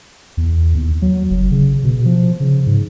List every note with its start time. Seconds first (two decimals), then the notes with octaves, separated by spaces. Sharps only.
0.37 E2
0.75 D#2
1.02 F#3
1.30 F#1
1.51 C#3
1.84 B2
2.05 F3
2.40 C#3
2.66 G#2